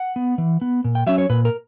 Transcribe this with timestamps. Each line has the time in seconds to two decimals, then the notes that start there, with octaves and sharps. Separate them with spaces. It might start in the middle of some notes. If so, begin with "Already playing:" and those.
Already playing: F#5
0.16 B3
0.38 E3
0.61 B3
0.84 A#2
0.95 G5
1.07 F#3 C#4 E5
1.18 C#5
1.30 A#2 B4
1.45 A#4